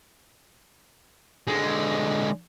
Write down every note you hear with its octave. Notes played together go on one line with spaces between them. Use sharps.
D3 G#3